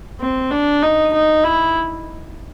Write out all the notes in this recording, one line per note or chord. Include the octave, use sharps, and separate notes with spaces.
C4
D4
D#4
D#4
E4